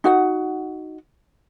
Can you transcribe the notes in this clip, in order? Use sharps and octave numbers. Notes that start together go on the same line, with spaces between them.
D#4 F#4 F#5